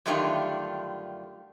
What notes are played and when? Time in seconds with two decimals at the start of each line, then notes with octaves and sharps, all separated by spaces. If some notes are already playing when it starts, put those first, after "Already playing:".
0.06 F#2 D3 D#3 G3 A3 F4